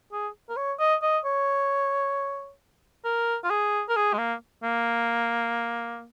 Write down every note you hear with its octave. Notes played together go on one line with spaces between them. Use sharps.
G#4
A#4
C#5
D#5
D#5
C#5
A#4
F4
G#4
A#4
G#4
G#3
A#3
A#3